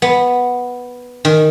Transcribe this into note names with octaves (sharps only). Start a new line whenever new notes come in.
B3
D#3